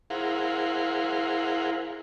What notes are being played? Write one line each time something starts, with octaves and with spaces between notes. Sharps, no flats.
E4 G#4 A#4 C5 F5 F#5